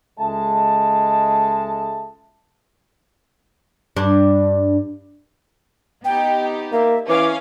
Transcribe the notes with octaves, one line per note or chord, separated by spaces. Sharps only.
C#2 G#3 A4 D#5 E5 A5
G2 D4
B3 D#4 G4 G5
A#3 E5
E3 C#4 F5 D6